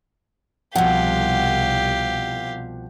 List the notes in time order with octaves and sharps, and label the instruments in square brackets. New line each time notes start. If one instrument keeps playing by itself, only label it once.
[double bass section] C2 [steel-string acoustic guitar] B2 F3 [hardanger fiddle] G4 F5 [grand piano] F#5